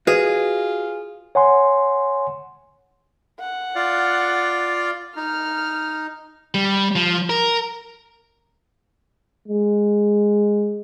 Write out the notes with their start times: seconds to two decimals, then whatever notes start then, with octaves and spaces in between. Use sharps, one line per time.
0.07 F4 F#4 G#4 B4 D#5
1.35 C#5 F#5 G#5 C6
3.40 F#5
3.75 F4 D5 F5
5.16 D#4 F6
6.54 G3
6.96 F3
7.30 A#4
9.48 G#3